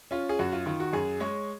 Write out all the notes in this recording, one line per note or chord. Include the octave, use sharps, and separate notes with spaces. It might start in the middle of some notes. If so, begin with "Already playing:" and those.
C#4 F4
G#4
F#2 F#4
F4
D#3 F4
F#4
F#2 G#4
G#3 C#5